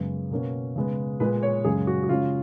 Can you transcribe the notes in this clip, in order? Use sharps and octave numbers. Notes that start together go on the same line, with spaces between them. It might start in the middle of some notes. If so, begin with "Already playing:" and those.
Already playing: F#2 C#3 G#3 B3
B2 A#3 C#4
C#3 G#3 B3
A#2 G#3 B3 B4
C#5
F#2 C#3 G#3 C#4 G#4
F#4
F#4
C#3 G#3 C#4 F4